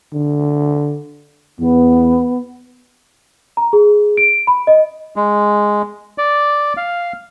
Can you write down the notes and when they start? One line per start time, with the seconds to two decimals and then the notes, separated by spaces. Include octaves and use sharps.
0.13 D3
1.59 E2 B3
3.57 A#5
3.73 G#4
4.17 D7
4.47 B5
4.67 D#5
5.16 G#3
6.18 D5
6.77 F5